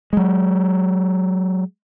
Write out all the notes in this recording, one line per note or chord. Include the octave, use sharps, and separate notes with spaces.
F#3 G#3